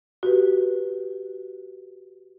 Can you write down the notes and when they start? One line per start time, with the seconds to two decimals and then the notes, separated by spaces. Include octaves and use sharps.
0.23 F#4 G4 B4